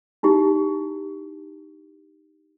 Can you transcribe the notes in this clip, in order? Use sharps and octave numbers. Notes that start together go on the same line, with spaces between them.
D#4 E4 G4